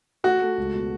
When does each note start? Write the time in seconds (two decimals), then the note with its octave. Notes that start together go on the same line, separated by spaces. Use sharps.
0.24 A3 F#4
0.41 A3
0.58 C#2
0.74 B2